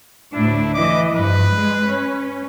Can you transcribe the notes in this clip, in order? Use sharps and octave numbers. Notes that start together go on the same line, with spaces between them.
D2 A2 D4 E4
E3 B4 D#5 D6
G2 F3 B4
G#3
C#4